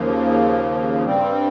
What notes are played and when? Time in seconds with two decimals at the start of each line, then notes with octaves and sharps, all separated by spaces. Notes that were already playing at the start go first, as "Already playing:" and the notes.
Already playing: D#2 C#3 F3 A#3
1.05 G2 G3 C4